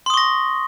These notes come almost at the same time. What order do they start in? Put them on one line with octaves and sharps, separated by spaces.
C6 D#6 C#6 A#6